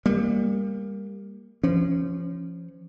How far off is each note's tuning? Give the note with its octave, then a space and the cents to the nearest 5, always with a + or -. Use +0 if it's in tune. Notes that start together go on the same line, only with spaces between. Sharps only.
G3 +30 A#3 +0
F3 -25 C#4 +0